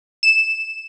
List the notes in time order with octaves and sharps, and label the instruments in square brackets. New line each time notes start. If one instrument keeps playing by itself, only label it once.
[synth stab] E7